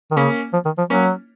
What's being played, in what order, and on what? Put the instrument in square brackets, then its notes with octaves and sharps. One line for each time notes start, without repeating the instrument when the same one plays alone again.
[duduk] D#3
[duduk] C#3 [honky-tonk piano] A#3 C#4
[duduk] F3
D#3
F3
[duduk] F#3 [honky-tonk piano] A#3 C#4